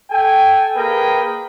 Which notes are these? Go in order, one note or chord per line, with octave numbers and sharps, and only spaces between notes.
A4 G5 G#5
A#3 G#4 A#4 B4 D#5 G5